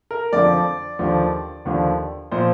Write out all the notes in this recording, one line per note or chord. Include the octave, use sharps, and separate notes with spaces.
A#4
F2 D3 F3 D5
D#2 D3 F3
D#2 D3 F3
A#2 F3 C5